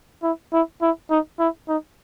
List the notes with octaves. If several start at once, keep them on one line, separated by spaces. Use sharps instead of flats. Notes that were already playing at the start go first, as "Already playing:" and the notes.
E4
E4
E4
D#4
E4
D#4